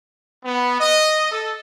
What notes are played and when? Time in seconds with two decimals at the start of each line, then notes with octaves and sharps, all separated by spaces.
0.44 B3
0.80 D#5
1.32 A4